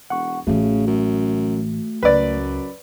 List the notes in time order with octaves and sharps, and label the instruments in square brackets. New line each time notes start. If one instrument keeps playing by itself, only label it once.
[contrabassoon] E1 [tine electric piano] F#5 C#6
[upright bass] A1 E3 [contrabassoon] C#3 [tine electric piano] A3 F#4
[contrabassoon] F#2
[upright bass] C#2 [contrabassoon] F#2 [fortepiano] B4 D5